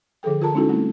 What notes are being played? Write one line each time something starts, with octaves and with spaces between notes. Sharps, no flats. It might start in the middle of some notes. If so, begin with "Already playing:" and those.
D3 F3 G#4 A4 G5
D3 F4 A#4 A5 A#5
G#3 C#4 D#4 E4 F#4 A4
G3 A3 C4 E4